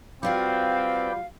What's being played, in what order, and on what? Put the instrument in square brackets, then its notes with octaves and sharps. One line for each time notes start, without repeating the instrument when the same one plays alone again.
[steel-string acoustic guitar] G3 F4 F#4 [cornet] C4 [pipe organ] B4 D5 G5 [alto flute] F5